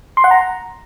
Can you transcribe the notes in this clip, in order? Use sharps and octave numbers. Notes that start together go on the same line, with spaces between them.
C6
F#5
A#5